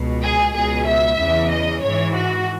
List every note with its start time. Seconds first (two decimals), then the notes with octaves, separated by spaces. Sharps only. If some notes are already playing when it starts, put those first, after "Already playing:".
Already playing: C#2 B2
0.22 G#4
0.54 C#2 B2 G#4
0.87 E5
1.18 E2 C#3 E3
1.51 D#5
1.82 G#2 E3 C#5
2.15 F#4